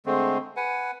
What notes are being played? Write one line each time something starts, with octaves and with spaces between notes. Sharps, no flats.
D3 G#3 A3 C4
B4 F#5 G#5